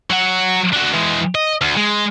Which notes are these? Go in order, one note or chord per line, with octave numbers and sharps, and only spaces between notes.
F#3 F#5
D4 F#4
E3 G#3
D#5
D2
G#3